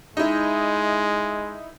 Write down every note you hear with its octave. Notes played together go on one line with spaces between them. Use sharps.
G#3 D#4 E4